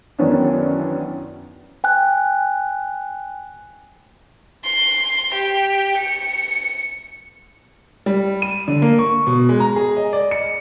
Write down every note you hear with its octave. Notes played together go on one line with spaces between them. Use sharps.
F#2 D#3 E3 B3 C#4 D4
G5 G#5 F#6
C6
G4
C#7
G3
D#7
D3
A#3
C#6
B2
G#3
A#5
G#4
D#5
D5
C#7